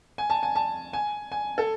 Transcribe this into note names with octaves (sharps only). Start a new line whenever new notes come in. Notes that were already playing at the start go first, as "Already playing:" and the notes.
G#5
A5
G#5
A5
G#5
G#5
A4